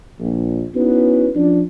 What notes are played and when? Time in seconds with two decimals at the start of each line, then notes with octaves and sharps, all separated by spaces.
0.20 A#1
0.75 B3 C#4 D#4 E4 F#4 B4
1.36 F3 C#4 D4